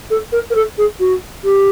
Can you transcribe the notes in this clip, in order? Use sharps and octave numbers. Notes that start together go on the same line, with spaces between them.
A4
A#4
A#4
A4
G#4
F#4
G4